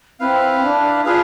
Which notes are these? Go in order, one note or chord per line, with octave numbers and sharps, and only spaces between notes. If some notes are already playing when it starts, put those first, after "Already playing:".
C4 E4 B4 F5
D4
D4 F4 G#4 B4 F5